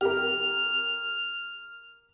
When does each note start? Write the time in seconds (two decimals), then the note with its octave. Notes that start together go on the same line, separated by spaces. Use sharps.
0.01 G4 A#4 F6